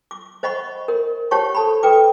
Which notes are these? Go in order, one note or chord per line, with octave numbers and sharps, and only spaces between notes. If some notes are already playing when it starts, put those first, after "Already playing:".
D6
C5 D#5 F#5 B5 C#6
A#4
G4 C5 C#5 F#5 A5 C#6
A4 A5 B5
A4 B4 G5 D6